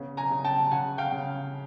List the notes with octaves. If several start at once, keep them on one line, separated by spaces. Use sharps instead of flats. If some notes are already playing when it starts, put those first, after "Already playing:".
Already playing: C#3 B3
G#5 A#5
C#3
G5 A5
C#3 F#5 G#5
F5 G5
C#3